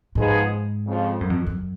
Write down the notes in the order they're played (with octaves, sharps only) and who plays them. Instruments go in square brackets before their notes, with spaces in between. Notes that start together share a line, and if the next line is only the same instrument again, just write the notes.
[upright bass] G#2 [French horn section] F3 G#3 B3 D#4 G#4
[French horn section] F2 C#3 F3
[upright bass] F#2
F2
F#2